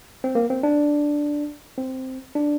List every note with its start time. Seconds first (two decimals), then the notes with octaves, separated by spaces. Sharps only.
0.24 C4
0.35 A#3
0.50 C4
0.63 D4
1.78 C4
2.35 D4